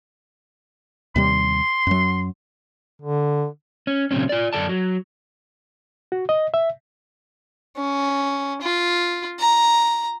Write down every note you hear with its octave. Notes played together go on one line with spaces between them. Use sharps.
D#2 C3 G3 C6
F#2 F#3
D3
C#4
A#2 C#3 F#3 C4 C#4
F4 D5
F#2 A4 D5 A5
F#3
F#4
D#5
E5
C#4
F4
A#5